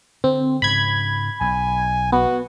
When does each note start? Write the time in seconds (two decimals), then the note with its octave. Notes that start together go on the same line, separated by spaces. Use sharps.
0.24 D3 C4
0.62 G#2 C#3 B5 G#6
1.41 B1 G#5
2.12 B3 F#4